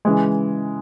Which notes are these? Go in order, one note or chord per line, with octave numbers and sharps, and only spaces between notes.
C#3 E3 G#3